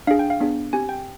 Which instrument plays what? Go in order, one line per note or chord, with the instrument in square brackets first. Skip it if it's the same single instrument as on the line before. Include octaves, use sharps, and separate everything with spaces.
[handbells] D4 G#4 F5
G5
F5
B3 D4 G#4
C4 G4 G#5
G5